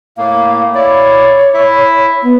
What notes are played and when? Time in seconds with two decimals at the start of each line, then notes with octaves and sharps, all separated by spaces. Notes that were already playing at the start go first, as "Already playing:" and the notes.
0.18 A2 A#3 F5
0.75 E4 C#5 D5
1.54 E4 E5
2.23 B3